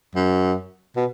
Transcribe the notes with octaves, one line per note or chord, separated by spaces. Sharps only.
F#2
B2